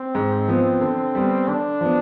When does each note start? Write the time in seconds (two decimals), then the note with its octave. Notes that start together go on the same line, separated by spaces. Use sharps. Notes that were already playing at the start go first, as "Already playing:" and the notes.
Already playing: C4
0.15 G#2
0.48 F3 B3
0.81 D3
1.15 G3 B3
1.48 D3 D4
1.81 F3 B3